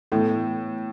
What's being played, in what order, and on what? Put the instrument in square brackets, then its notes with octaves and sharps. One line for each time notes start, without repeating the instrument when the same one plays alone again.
[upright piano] A2 [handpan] E3 B3 E4 A4